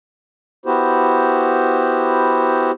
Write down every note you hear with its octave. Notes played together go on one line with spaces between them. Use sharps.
B3 E4 F#4 G4 C5